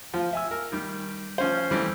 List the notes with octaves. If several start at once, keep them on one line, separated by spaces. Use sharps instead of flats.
F3
E5 G#5 E6
A#4
D#3 G3
F3 C#4 C5
E3 G3 A3 C4